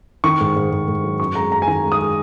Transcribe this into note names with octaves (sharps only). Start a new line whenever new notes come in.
D#3 C#6
G#2
G#2
G#2
G#2
F#3
F#2 C#6
G#3 A#5
F#2 A#5
G#5
D#3 A#5
G#3
D#6
G#3